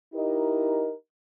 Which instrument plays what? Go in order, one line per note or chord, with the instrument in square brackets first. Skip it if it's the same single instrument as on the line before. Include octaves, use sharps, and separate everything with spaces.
[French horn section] D#4 E4 G4 A#4 D#5